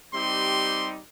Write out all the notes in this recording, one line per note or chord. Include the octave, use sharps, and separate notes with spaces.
G3 C4 D#4 G4 C6